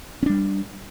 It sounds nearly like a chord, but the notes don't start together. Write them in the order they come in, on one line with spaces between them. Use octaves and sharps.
C#4 D4 G3